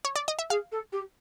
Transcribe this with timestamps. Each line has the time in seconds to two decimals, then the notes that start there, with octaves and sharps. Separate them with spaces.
0.05 C#5
0.16 D5
0.28 D#5
0.39 E5
0.50 G#4 F5
0.72 A4
0.92 G4